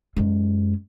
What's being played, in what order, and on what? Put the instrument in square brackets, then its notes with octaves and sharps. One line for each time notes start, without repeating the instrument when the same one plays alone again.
[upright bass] F#2 G#3